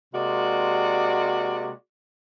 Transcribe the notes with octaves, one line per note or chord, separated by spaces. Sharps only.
C3 G#3 A#3 F#4 D5